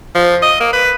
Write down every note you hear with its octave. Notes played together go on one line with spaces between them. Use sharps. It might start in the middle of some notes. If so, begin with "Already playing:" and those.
F3
D#5
A#3
B4